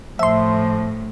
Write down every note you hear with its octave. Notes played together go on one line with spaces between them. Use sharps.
A2 F3 E5 C6